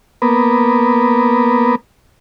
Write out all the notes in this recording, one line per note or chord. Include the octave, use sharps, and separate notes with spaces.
A#3 B3